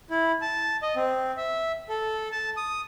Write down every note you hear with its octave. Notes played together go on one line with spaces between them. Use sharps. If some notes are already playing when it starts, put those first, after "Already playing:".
E4
A5
D#5
C4
E5
A4
A5
D#6